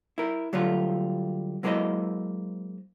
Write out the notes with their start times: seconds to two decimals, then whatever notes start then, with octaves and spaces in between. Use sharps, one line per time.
0.18 E4 A#4
0.53 D3 F#3 G3 A3 F4
1.63 F#3 G#3 A#3 E4 C5 D#5